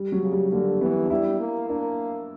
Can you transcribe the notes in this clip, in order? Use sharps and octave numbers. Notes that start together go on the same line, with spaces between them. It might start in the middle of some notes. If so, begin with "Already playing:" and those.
Already playing: G3
F#3
C#3
G3
D3 A#3
E3 B3
D4
G3 E4
A#3
A#3 D4